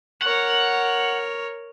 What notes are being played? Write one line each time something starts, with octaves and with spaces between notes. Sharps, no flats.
A#4 C#5 F#5